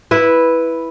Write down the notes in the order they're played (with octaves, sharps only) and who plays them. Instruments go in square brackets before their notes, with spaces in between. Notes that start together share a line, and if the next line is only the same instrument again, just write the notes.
[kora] E4 B4